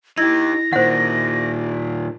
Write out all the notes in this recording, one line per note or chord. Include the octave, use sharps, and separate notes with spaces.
D#4 E4 G4 G#6 A#6
A#2 D#3 C5 F#5